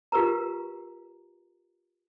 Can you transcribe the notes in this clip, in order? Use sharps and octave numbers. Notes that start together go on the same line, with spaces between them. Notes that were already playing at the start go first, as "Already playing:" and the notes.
F4 G4 A#4 B4 A#5